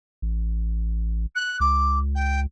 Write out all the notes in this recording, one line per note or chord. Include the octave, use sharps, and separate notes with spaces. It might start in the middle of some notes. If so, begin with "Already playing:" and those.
A1
F#6
C#2 D6
G5